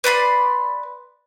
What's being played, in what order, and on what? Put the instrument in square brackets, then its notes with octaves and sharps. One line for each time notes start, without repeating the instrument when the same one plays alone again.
[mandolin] B4 D5 B5 C6